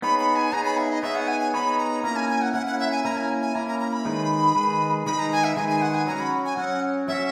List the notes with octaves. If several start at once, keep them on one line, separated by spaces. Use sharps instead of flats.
B3 D#4 G#4 C#5 B5
B5
G#5
B3 D#4 G#4 C#5 A#5
B5
E5
D#5
B3 D#4 G#4 C#5 E5
F#5
G#5
G#5
B3 D#4 G#4 C#5 B5
A#5
A#3 C#4 E4 A#5
G#5
G#5
F#5
A#3 C#4 E4 F#5
F#5
E5
G#5
A#3 C#4 E4 A#5
G#5
G#5
A#3 C#4 E4 A#5
A#5
A#5
B5
D#3 G#3 D#4 G#4 B4
D#3 G#3 D#4 G#4 B4
D#3 G#3 D#4 G#4 B4 B5
A#5
G#5
E5
D#3 G#3 D#4 G#4 B4 G#5
G#5
F#5
G#5
F#3 C#4 F#4 A#5
B5
G#5
F#3 C#4 F#4 F#5
F#3 C#4 F#4 E5